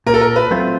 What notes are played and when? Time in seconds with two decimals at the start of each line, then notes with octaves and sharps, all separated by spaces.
0.06 A#2 A#4
0.14 A4
0.21 A#4
0.36 B4
0.51 F#3 A3 C4 F4